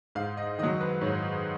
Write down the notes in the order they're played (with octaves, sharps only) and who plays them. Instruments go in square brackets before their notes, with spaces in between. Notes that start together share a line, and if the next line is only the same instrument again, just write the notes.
[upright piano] G#2 F5
D#5
D#3 D#5
F#3
B4
G#2 C#5